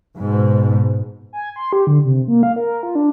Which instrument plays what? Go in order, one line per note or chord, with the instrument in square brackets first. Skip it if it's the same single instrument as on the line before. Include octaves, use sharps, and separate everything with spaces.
[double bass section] G#2 B2
[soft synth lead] G#5
C6
G4
D3
C3
A#3
F5
A#4
F4
D4